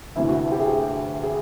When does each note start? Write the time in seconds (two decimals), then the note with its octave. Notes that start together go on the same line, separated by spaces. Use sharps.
0.16 D2 C3 E3 E4
0.28 F#4
0.52 G4
0.60 G#4
0.67 G4
1.23 G#4